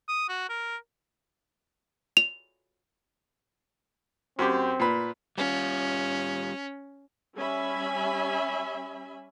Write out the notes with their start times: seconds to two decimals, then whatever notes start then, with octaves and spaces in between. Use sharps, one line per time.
0.08 D#6
0.29 F#4
0.49 A#4
2.17 F7
4.39 F#2 C4 G4
4.80 A#2 B4
5.38 G3 C#4 F4
7.36 G3 C#4 E5 G#5 B5